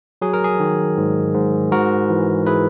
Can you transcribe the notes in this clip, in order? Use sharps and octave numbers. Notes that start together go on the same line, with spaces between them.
F#3 G#4
A#4
G#4
D#3
G#2
G#2
G#2 F#4 A#4
E3
E4 G#4 B4